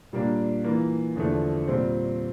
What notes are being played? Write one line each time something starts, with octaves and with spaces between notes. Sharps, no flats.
A#2 G3 A#3 D4
E3 A#3 F4
E2 D3 F3 A3
A#2 G3 C4